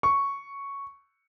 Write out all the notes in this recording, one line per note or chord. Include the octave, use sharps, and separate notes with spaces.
C#6